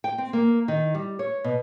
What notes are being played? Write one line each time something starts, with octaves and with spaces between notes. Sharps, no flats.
G5
C4
A#3
D#3
G3
C#5
B2